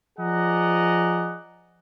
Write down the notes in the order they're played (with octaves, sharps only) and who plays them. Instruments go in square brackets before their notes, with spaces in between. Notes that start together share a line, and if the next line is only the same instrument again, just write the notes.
[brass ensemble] F3 G#4 D5 D#5 F#5 A#5